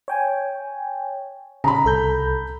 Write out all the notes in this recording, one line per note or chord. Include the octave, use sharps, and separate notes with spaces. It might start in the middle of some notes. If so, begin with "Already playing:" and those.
C#5 G5 G#5
C#3 A#5 B5
C2 A4 G6